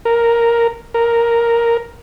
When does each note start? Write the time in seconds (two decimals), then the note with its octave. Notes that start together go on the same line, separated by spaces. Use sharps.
0.05 A#4
0.94 A#4